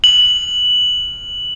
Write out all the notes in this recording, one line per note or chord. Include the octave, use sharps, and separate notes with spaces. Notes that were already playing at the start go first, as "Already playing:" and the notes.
F#7